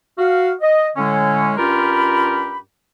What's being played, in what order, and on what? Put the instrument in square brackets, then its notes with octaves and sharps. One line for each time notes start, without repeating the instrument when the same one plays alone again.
[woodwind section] F#4 F5
D#5
A2 D3 G#3 C#4
G2 C#4 F4 G4 A#4 B5